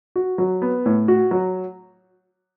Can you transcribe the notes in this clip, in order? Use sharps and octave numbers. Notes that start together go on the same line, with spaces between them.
F#4
F#3
B3
A2
F#4
F#3